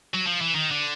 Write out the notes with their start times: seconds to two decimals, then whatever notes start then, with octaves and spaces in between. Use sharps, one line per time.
0.14 F#3
0.27 F3
0.41 E3
0.55 D#3
0.71 D3